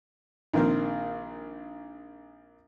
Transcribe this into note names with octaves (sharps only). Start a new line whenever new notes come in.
A#1 D#3 A#3 C4 A#4 F5